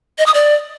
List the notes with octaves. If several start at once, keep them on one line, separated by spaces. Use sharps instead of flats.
D#5
D#6
D5